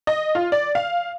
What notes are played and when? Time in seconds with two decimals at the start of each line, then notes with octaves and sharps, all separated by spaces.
0.07 D#5
0.35 F4
0.52 D5
0.75 F5